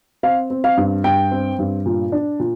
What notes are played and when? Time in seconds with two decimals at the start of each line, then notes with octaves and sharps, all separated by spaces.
0.23 C4 F5
0.50 C4
0.64 F5
0.77 G2
1.04 G2 G5
1.31 C4
1.59 G2
1.86 A#2
2.12 D4
2.39 A#2